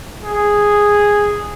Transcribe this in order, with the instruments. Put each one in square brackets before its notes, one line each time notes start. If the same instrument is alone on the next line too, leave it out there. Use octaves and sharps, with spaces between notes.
[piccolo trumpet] G#4